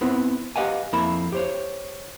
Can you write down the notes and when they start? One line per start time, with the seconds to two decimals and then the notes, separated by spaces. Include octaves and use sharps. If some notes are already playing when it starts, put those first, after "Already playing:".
0.01 B3 C4 E4 B4
0.56 G4 B4 D#5 F5 F#5 G#5
0.93 F2 A#3 E4 E5 B5
1.32 G4 C5 C#5